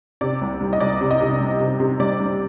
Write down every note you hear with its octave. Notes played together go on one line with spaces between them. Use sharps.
C3 D5
C2
G3
D#5
C2 D5
C3
D#5
C3
G3
C3
C3
G3 D5
G3